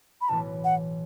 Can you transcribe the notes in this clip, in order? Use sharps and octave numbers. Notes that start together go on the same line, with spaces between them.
B5
B1 A2 E3 B3 A5
F#5